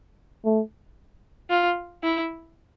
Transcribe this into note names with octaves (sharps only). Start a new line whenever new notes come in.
A3
F4
E4